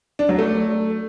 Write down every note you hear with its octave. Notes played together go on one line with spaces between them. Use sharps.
D4
F#3
A3